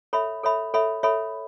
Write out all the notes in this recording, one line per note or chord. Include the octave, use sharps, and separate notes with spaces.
A4 C#5 E5 B5
A4 C#5 E5 B5
A4 C#5 E5 B5
A4 C#5 E5 B5